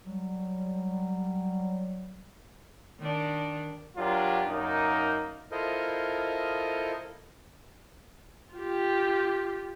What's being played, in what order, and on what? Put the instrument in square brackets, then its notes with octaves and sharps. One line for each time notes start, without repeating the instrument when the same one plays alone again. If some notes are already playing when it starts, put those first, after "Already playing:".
[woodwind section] F#3 G3
[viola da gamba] D#3 D4
[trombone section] F#3 D4 F4 G4 A#4
F#2 A#3 D#4
[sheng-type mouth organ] E4 F4 A4 A#4 C5 D#5
[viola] F4 G4